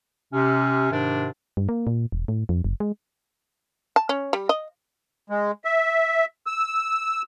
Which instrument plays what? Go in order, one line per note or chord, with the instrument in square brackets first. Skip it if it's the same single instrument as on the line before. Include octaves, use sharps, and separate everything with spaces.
[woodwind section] C3 C#4
G#2 C3 D#3 D4
[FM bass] G2
A#3
A#2
E1
A2
F2
F#1
G#3
[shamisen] A5
C#4
G3
D#5
[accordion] G#3
E5
E6